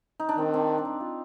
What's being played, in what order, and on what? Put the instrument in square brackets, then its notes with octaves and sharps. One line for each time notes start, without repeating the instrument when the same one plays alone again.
[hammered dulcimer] D#4
D4
[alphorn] D#3 [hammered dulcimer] C4
[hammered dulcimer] C4
D4
D#4
F4